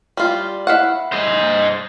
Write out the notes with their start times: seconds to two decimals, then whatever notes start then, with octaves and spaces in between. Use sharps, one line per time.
0.17 G3 F4
0.67 E4 F5 F#5
1.12 C5 D#5